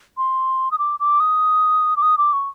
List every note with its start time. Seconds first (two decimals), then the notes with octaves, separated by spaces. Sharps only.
0.18 C6
0.71 D#6
0.78 D6
1.00 D6
1.20 D#6
1.97 D6
2.02 D#6
2.18 D6
2.33 C#6